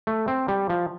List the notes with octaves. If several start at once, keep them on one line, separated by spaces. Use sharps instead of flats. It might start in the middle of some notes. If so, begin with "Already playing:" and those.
A3
C4
G3
F3